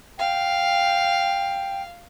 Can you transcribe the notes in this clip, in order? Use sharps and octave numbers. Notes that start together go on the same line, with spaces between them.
F5 G5